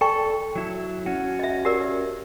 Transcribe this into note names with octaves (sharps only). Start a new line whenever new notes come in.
A4 D5 G5 C#6
F#3 E4
C#4 F#4
D#5 E5
G4 A#4 D5